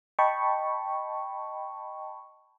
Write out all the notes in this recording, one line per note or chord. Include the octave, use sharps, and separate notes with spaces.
D#5 G5 A5 B5 C#6